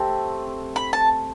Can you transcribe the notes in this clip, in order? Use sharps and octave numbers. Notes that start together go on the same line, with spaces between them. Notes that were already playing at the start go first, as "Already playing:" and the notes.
Already playing: A3 C4 G4 A5
B5
A5